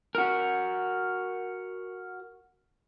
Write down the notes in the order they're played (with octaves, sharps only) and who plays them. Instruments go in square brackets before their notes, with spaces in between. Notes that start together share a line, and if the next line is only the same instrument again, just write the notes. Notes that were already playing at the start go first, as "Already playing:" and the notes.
[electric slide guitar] F#4 A#4